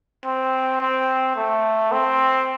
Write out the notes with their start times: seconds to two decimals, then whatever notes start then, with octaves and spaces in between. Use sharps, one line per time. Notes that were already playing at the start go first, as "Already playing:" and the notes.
0.25 C4
0.81 C4
1.36 A3
1.92 C4